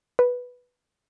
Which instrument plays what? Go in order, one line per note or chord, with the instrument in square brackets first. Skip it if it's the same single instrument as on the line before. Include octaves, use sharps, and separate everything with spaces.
[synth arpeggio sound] B4